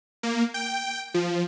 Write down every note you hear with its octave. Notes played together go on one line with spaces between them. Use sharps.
A#3
G5
F3